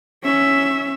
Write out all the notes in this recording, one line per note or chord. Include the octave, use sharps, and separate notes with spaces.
C#4 E5